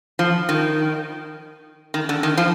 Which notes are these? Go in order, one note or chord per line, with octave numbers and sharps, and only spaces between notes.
F3
D#3
D#3
D3
D#3
F3